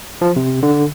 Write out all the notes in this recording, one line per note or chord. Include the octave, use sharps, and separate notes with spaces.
F3
C3
D3